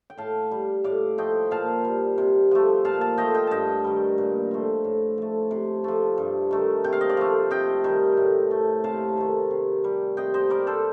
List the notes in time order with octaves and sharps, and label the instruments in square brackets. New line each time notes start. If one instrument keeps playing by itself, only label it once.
[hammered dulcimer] G5
A2 F5 A5
G3
A2 D5 F5
F3 A3 D#5 G5
A#2 F5 A5
G3
C3
F3 A3
A#2 F5 A5
F5 A5
F3 A3 D#5 G5
D#5 G5
G2 D#5 G5 A5
D#3 G3
A#2
F3 A3
A2
F3 A3
C3
F3 A3
G2
D#3 A3
C3 G5
F5
D#5
D5 F5
F3 A3
C3 D#5 G5
D#3 G3
A2
A3
C3 F5 A5
D#3 A3
C3
G3
C3 D#5 G5
C5 D#5
G3 A#4 D5
A4 C5